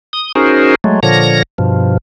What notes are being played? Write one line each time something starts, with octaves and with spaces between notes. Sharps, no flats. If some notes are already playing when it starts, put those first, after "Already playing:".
D#6
C#4 D#4 F#4 G#4 A#4 C5
F#3 G#3 A3
A#2 D3 F3 C#5 A#6
G2 B2 F3